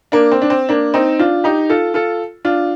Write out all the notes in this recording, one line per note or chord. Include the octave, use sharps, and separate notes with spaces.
A#3 D4
C4
D4
C4
A#3 D4
C4 D#4
D4 F4
D#4 G4
F4 A4
F4 A4
D4 F4